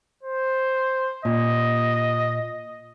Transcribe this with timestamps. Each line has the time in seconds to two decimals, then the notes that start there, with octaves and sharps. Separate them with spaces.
0.23 C5
1.25 A#2 D#5